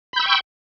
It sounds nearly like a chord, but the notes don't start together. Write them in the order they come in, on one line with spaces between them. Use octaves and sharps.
B5 G6 E6 C#6 G5